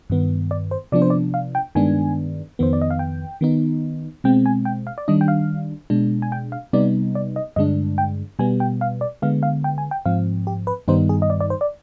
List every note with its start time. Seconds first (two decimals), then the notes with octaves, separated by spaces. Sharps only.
0.10 G2 D#3 B3
0.51 D5
0.71 C5
0.92 C3 F3 B3 D4 D5
1.02 C5
1.10 D5
1.34 F5
1.55 G5
1.75 G2 D#3 G#3 B3 D4 G#5
2.59 F2 D#3 B3 C5
2.73 D5
2.82 D#5
2.91 F5
2.99 G5
3.41 D#3 B3 D#4
4.24 B2 G#3 C4 G5
4.46 G#5
4.65 G5
4.87 F5
4.98 D5
5.08 D#3 G3 D4 D#5
5.21 G5
5.28 F5
5.90 B2 G#3 D4
6.22 G#5
6.32 G5
6.52 F5
6.73 C3 G3 B3 D#4 D5
7.15 D5
7.36 D#5
7.56 G2 D3 G#3 D4 D#5
7.98 G5
8.39 B2 G3 B3 G#5
8.60 G5
8.81 F5
9.01 D5
9.22 D3 G#3 B3 F5
9.43 F5
9.64 G5
9.78 G#5
9.91 G5
10.06 G#2 F3 C4 F5
10.47 G4
10.67 B4
10.88 G2 D#3 G3 B3 D#4 C5
11.09 G#4
11.22 D#5
11.30 D5
11.41 D5
11.50 C5
11.61 D5